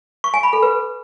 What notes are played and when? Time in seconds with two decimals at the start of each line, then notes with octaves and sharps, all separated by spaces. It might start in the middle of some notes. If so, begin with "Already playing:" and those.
0.24 C#6
0.34 G#5
0.43 B5
0.53 A4
0.62 B4